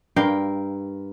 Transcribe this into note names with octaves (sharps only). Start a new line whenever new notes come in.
G2 A#4 F5 G5